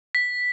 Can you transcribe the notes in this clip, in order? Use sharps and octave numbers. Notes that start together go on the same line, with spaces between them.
B6